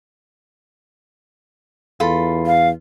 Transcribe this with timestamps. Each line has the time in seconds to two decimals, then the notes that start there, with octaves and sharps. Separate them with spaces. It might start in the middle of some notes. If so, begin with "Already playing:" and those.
2.00 E2 F4 A4 B5
2.46 F5